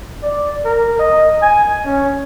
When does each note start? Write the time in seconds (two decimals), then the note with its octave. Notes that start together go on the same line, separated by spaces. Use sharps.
0.23 D5
0.65 A#4
0.99 D#5
1.42 G#5
1.85 C#4